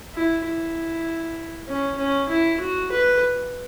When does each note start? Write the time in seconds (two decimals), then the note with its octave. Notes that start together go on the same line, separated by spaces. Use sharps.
0.14 E4
0.45 E4
1.69 C#4
1.98 C#4
2.29 E4
2.60 F#4
2.92 B4